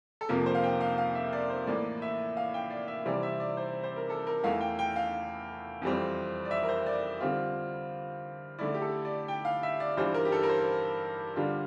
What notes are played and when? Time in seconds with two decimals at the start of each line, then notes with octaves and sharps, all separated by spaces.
0.21 A4
0.29 F2 C3 F3 A#3 A#4
0.46 C5
0.55 F5
0.64 G5
0.80 F5
0.98 F5
1.15 E5
1.33 D5
1.50 C5
1.67 A2 E3 A#3 D5
2.02 E5
2.37 F5
2.54 G5
2.70 D5
2.88 E5
3.05 C3 E3 G3 C4 D5
3.23 E5
3.40 D5
3.57 C5
3.83 C5
3.96 A#4
4.10 A4
4.27 A#4
4.44 E2 E3 A3 E4 F5
4.61 G5
4.79 G5
4.96 F5
5.82 F2 E3 G3 C4
6.45 D5
6.51 E5
6.63 A#4
6.69 C5
6.86 D5
7.21 D3 G3 C4 F4
8.59 D3 A3 E4 D5
8.74 G4
8.82 A4
9.05 D5
9.28 G5
9.45 F5
9.63 E5
9.80 D5
9.97 G2 E3 G3 D4 F4 C5
10.14 A#4
10.25 G4
10.32 A4
10.43 A#4
10.49 C5
11.36 D3 G3 D4 F4